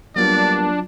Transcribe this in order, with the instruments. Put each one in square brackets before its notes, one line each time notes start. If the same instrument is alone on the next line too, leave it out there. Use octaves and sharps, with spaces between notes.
[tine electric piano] F#3 F4 [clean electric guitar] G3 A#3 B3 [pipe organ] D4 [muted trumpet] D5